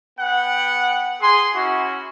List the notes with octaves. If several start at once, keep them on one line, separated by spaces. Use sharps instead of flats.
B3 F#5 G5
G#4 C6
C#4 E4 F#4